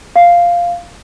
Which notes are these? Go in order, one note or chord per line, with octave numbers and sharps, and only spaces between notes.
F5